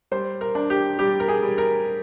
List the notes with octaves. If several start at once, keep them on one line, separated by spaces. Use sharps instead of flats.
G3 C5
A#4
D4
G4
G3 G4
A#4
G#4
G3
A#4